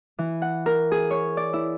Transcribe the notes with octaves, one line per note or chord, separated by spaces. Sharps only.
E3
F#5
A#4
G#4
C#5
D5
E4